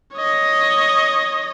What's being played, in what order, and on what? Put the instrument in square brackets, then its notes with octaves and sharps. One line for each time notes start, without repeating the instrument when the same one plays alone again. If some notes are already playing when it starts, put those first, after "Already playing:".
[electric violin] C#5 D#5